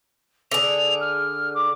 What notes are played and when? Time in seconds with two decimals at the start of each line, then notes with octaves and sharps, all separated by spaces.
0.52 D3 G#4 F7
1.01 F6
1.55 D6